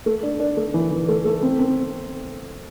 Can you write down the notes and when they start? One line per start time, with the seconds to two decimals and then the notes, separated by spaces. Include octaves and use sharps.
0.06 A3
0.23 D4
0.40 D4
0.57 A3
0.74 E3
0.91 E3
1.08 A3
1.25 A3
1.43 C4
1.59 C4